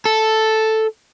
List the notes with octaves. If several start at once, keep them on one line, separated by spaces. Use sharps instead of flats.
A4